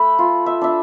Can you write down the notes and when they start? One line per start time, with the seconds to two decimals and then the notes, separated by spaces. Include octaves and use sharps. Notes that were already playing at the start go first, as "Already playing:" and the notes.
Already playing: A3 B5
0.19 F4
0.46 E5
0.61 D4 E5